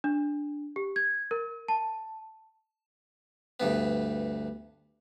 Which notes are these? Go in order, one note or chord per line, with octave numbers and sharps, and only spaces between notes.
D4
G4
G#6
A#4
A5
D2 G2 B3